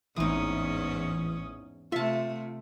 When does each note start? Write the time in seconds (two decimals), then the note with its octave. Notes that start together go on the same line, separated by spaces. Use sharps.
0.16 A1 E2 G#2 E3 C4 C#4 D#4 D#6
1.92 C3 A3 F4 E5 A5